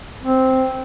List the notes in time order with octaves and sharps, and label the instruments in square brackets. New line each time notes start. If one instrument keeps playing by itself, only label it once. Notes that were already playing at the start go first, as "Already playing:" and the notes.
[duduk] C4